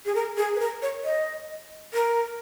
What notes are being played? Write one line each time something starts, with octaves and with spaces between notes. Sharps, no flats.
G#4
A#4
G#4
B4
A#4
C#5
D#5
A#4